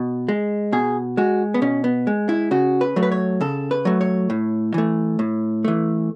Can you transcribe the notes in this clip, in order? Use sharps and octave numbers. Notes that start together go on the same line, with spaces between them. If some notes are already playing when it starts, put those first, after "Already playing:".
Already playing: B2
G#3
B2 G#4
G#3 F#4
B3
B2 C#4
B3
G#3
E4
C#3 F#4
B4
F#3 A3
B4
C#5
C#3 A4
B4
F#3 A3
C#5
A2
E3 A3
A2
E3 A3